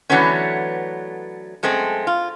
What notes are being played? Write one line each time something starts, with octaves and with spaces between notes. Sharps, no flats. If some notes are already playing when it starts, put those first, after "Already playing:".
D3 E3 F#3 A3 B3 C#4
F#2 G#3 A3 C4
F4